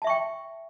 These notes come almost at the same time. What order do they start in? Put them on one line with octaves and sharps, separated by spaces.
A5 E5 C#6 G5